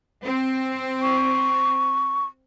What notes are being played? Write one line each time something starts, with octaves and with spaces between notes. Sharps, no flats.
C4
C#6